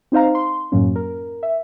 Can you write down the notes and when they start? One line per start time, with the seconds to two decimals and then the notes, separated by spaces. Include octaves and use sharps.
0.12 C4 D#4 C5 F5 A#5
0.35 C6
0.72 F#2 A2 F#3 A#3 C#4
0.96 A#4
1.43 E5